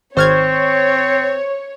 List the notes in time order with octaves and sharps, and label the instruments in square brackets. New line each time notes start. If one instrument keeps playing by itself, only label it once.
[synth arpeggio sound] G#1 F6 G#6 [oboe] C4 [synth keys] C5 C#6 [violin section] C#5